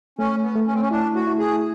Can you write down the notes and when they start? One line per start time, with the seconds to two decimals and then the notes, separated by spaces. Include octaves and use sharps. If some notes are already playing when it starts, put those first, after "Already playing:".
0.19 A3 C#4
0.43 B3
0.55 A3
0.67 C#4
0.74 C4
0.81 C#4
0.91 D4 E4
1.15 F#4
1.27 E4
1.39 G#4